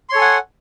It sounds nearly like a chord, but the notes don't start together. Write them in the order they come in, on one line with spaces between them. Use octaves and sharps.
C6 C#5 A4 G#5 F#5